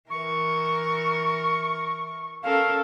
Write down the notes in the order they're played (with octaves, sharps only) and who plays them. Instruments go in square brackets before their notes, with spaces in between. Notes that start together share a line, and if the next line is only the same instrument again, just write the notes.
[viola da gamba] E3 A#4 [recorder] C#6
[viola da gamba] C#4 A4 A#4 [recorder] F5